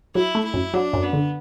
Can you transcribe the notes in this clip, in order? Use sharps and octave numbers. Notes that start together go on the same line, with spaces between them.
F#3 E4
A3
E4
F#2
F#3 D4
F#2
B3
D3